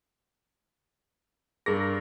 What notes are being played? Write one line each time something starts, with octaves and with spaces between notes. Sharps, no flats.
G2 G#4 A#4 A#6